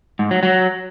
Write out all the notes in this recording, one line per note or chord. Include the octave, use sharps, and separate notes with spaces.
G#2
F#3
F#3